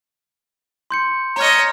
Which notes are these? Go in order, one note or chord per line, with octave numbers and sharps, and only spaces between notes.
C6 G6 C#7
C#5 D#5 A#5 F6